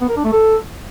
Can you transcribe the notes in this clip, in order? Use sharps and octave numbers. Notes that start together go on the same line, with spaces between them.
B3
A#4
D4
A3
A4